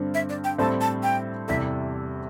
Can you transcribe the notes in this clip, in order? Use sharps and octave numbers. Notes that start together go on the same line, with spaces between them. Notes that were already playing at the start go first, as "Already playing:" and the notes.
Already playing: G2 D3 C4
E5
D5
G5
A2 G3 C4 A4 C5 A5
A5
G5
E2 C3 G3 E4 A4 E5